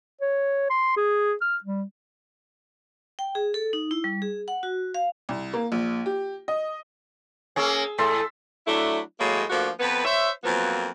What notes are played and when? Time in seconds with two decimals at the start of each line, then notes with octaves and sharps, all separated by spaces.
0.21 C#5
0.70 C6
0.97 G#4
1.42 F6
1.64 G3
3.19 G5
3.35 G#4
3.54 A4
3.73 D#4
3.91 E4
4.04 G3
4.22 G#4
4.48 F#5
4.63 F#4
4.94 F5
5.29 C2
5.54 A#3
5.72 A#1
6.06 G4
6.48 D#5
7.56 A#3 C#4 G#4 E6
7.98 A2 A4 E5 A5 C6
8.67 F#3 A3 D4 E4
9.20 A2 F#3 G#3 A#3
9.50 F3 A3 A#3 D4 F#4
9.80 F2 B3 B4
10.04 C5 C#5 E5
10.44 F2 F3 F#3 A#3 B3